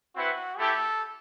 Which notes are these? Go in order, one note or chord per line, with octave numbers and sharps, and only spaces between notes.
C4 E4 F#4 B4 F#5
A3 E4 G4 A4